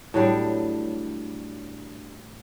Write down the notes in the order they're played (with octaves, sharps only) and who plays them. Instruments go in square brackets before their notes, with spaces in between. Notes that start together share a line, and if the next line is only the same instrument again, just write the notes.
[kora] A2 F#3 G3 D4